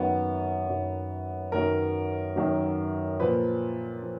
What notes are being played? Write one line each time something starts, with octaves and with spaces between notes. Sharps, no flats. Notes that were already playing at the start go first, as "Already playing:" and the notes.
Already playing: F#2 D#3 F#3 B3
F#2 D#3 F#3
F#2 D#3 F#3 A#4
F#2 D#3 F#3
A#2 F3 B4
F3